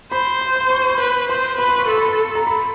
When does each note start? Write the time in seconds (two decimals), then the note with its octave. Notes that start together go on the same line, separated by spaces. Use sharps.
0.12 C5 B5
0.41 C6
0.56 C6
0.70 C#6
0.80 C6
0.89 B5
0.98 B4 C6
1.29 C5 C6
1.58 B4 B5
1.69 C6
1.78 C#6
1.88 A4 C6
1.98 B5
2.08 C6
2.35 A#5
2.47 B5